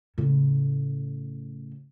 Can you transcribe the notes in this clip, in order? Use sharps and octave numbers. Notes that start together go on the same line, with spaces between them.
A2 C#3